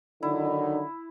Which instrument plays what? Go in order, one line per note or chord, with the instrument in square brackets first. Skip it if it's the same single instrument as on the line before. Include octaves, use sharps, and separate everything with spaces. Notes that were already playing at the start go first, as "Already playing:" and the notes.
[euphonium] D3 [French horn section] D#3 F#3 D#4 [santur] E4